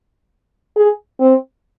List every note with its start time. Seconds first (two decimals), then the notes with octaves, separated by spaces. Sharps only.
0.77 G#4
1.20 C4